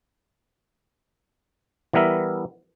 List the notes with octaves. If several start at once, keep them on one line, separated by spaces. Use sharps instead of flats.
E3 G3 B3 A#4 E5